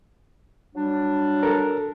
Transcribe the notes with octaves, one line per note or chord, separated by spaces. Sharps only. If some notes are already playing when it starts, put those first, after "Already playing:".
F#3 G3 D4
A4 A#4